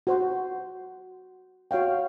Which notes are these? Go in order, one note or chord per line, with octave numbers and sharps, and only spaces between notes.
F#4 C5 C6
F#4 C#5 F5 G5